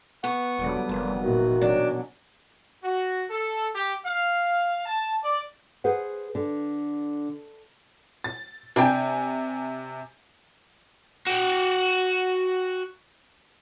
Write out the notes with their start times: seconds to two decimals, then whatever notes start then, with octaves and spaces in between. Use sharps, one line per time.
0.24 B3 F#5 C#6
0.58 E1 D3 F#3 G3
0.89 F1 A#2 E3
1.23 A#2 D#3 E3 F#4
1.61 B2 F#3 C#4 D4
2.83 F#4
3.30 A4
3.75 G4
4.05 F5
4.86 A5
5.23 D5
5.84 G#4 B4 C5 F#5
6.35 D3
8.24 A6
8.76 C3 D4 G5 G#5
11.27 F#4 G5